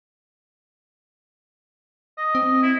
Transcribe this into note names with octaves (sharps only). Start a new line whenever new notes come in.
D#5
C4
E4